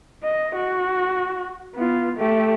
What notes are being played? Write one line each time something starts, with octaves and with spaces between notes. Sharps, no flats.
D#5
F#4
B3 F4
A3 G4